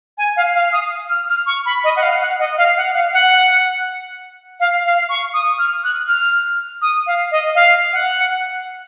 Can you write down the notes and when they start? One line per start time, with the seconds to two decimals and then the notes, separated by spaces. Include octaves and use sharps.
0.18 G#5
0.37 F5
0.55 F5
0.73 D#6
1.10 F6
1.29 F6
1.46 C#6
1.66 B5
1.84 D#5
1.96 F#5
2.02 F5
2.21 F#5
2.40 D#5
2.58 F5
2.77 F#5
2.94 F5
3.13 F#5
4.60 F5
4.85 F5
5.09 C#6
5.34 D#6
5.58 F6
5.84 F#6
6.08 F6
6.82 D#6
7.07 F5
7.31 D#5
7.55 F5
7.93 F#5